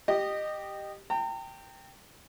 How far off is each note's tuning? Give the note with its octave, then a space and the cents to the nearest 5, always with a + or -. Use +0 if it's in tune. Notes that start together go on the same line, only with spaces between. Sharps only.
G4 +0 D#5 -20
G5 +0 A#5 -40